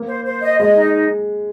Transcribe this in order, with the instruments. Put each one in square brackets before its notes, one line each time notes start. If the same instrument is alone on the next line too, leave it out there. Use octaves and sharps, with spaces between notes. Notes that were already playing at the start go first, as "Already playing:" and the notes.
Already playing: [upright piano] A#3
[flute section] C5
C5
D#5
[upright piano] G#3 [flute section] D#5
[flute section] D#4